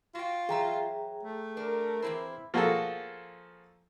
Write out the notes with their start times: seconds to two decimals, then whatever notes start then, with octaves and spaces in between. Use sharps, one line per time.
0.15 F4 F#4 G5
0.49 E3 F#3 G#4 E5 G5 A#5
1.23 A3
1.57 D4 A#4
2.02 E3 C4 E4 C5
2.54 F3 A#3 F#4 G#4 A4